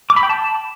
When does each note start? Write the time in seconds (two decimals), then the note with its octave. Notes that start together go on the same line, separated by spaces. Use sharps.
0.10 D6
0.16 B5
0.23 G5
0.29 A5